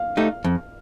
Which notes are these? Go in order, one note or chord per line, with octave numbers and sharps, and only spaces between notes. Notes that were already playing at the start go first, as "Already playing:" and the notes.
Already playing: F5
A3 D#4 G4
F2